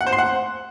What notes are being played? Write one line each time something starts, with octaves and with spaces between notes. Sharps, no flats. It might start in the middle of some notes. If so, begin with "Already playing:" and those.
F#5
C5
C6
F#5